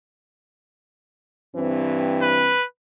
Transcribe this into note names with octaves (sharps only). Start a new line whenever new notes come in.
G2 E3 C4
B4